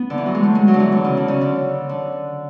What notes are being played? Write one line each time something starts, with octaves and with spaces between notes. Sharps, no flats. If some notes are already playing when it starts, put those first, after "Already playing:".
Already playing: B3
D3
E3
F#3
G#3
A3
G#3
F#3
D3
E3
D3
C#3
D3
C#3
D3
D3